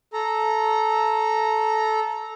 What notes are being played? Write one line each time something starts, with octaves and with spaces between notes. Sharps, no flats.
A4 A#5